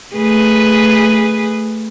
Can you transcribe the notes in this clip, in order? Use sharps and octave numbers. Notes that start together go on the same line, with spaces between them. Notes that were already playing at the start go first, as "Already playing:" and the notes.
A3 G#4 B4